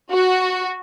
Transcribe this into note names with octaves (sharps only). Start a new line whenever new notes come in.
F#4